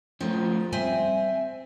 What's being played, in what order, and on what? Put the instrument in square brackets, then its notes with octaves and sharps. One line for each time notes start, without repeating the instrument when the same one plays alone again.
[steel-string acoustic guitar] F3 [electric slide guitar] A3 C4 C#4
[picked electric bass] G3 [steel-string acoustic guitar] C4 E5 [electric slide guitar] G#5